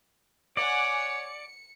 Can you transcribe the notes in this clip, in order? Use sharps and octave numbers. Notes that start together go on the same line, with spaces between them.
C#5 D5 F#5 G#5 D6
C#7